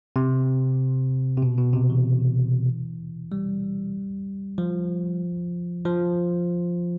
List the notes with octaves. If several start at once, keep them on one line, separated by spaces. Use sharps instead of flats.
C3
C3
B2
B2
C3
E3
G3
F3
F3